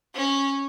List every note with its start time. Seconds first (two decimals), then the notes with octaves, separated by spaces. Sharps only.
0.15 C#4